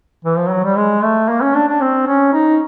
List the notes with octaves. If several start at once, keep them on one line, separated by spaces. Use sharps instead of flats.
E3
F3
F#3
G3
G#3
A3
A#3
C#4
D4
D4
C4
C#4
D#4